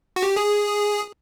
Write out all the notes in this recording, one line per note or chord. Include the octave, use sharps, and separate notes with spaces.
F#4
G4
G#4